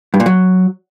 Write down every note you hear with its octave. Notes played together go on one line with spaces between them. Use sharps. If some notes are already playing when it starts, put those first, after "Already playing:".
G2
A#2
F#3